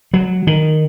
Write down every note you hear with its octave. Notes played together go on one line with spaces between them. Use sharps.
F#3
D#3